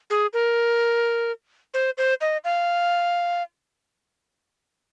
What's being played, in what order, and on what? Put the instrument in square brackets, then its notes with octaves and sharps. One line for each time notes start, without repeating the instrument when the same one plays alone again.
[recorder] G#4
A#4
C5
C5
D#5
F5